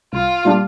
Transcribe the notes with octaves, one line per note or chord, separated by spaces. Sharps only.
C2 F4
A#2 G3 D4 G4